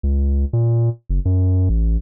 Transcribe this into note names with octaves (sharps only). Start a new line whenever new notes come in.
C#2
A#2
F#1
F#2
A1